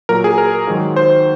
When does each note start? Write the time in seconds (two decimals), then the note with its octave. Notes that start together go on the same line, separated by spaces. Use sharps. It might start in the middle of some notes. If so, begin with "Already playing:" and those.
0.09 A#2 F#3 A#4
0.24 G#4
0.38 A#4
0.67 G#2 D#3 F#3
0.96 C5